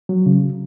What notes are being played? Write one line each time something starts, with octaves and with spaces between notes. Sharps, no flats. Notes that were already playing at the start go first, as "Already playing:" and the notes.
F#3
C#3